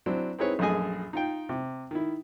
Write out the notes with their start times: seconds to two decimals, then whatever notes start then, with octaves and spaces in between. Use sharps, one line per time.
0.06 F#3 C4 D4 E4
0.39 C4 D#4 E4 G#4 B4 C#5
0.59 A#1 F#2 A3 G#4 D#5 G#5
1.13 D#4 F4 G5
1.49 C3
1.91 D#3 E4